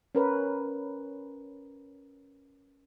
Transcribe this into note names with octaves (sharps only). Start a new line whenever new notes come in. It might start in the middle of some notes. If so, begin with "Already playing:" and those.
C#4 A#4 B4